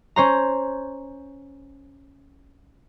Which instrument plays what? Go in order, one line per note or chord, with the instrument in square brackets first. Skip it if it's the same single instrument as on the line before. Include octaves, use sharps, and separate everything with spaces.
[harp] C#4 C5 A#5